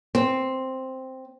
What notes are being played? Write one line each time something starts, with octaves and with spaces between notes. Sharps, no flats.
C4